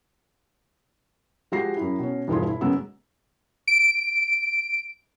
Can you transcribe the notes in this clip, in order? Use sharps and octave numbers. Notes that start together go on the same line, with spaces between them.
F3 G#3 F#4 G4 A#6 C7
F#2 E4
B2 C#4
E1 G2 F3 E4 G#4 C6
E4
F#2 C#3 G#3 B3 E6
D7